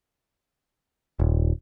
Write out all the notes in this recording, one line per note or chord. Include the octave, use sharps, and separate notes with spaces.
D#1